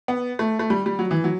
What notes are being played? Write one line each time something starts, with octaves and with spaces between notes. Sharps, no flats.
B3
A3
A3
G3
G3
F#3
E3
F#3